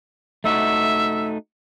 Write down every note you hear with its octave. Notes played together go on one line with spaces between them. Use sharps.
A3 D#4 F#4 E5